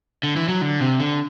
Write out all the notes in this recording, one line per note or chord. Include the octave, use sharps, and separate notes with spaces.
D3
E3
F#3
D3
C3
D3